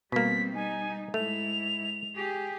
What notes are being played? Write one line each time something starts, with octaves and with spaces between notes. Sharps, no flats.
B2 G3 A#3 C4 B6
G3 D#4 G#5
G#2 A3 E4 F7
G4 G#4